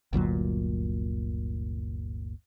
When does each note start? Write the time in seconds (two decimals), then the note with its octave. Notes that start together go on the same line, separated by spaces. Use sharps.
0.13 G1 D2 A#2 F#3